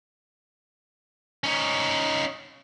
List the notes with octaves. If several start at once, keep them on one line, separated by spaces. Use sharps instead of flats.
C#4 D#4